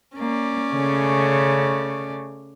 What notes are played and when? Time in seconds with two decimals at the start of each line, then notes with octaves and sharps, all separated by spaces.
0.16 A#3 C#4 D5
0.74 C#3 A3